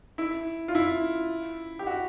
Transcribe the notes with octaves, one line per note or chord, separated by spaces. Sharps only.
E4
F4
E4
G4
F#4